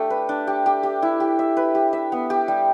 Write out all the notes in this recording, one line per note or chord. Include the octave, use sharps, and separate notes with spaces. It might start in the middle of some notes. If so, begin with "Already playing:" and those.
Already playing: A3 D4 G4
B4
D4
G4
G4
G4
E4
G4
E5
B4
G4
E5
B3
G4
G3